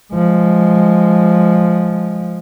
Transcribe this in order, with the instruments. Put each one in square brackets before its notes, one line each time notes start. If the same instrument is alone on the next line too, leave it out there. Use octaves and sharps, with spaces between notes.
[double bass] F3 G#3